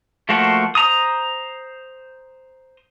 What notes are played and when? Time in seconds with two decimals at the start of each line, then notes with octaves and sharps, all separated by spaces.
0.29 F3 A3 A#3 F#4 C5
0.75 C5 A#5 D#6